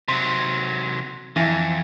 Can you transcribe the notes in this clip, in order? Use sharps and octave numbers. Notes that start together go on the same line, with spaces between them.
C3 F#3 C6
F2 E3 E5